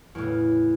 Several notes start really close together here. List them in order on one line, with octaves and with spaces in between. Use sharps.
E2 A2 C#3